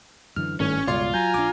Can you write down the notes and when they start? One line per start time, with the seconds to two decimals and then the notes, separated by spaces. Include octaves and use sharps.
0.36 F#2 D3 E3 F6
0.60 G#1 G2 D#3 A3 C#4 C#5
0.87 C#2 G2 B2 F4 D5 C6
1.14 F#3 G#5 A#5 G6
1.34 A#1 D4 D6